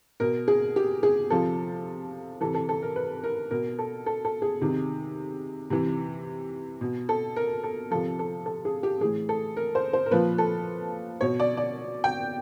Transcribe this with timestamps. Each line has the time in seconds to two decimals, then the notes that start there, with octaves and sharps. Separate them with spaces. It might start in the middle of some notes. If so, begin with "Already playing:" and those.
0.20 B2 A#4
0.48 G#4
0.76 G4
1.03 G#4
1.30 C3 F3 A4
2.41 C3 E3 A4
2.54 A4
2.69 A4
2.82 A#4
2.96 B4
3.24 A#4
3.51 B2 A#4
3.79 A4
4.06 A4
4.25 A4
4.42 G#4
4.61 C3 D#3
5.70 C3 E3
6.81 B2
7.09 A4
7.36 A#4
7.64 A4
7.91 C3 F3 A4
8.19 A4
8.46 A4
8.65 G#4
8.83 G4
9.00 A2 E3 G#4
9.29 A4
9.57 A#4
9.75 C5
9.93 C5
10.06 A#4
10.11 A#2 F3 B4
10.38 A4
11.21 B2 C#5
11.40 D5
11.57 D5
12.04 G5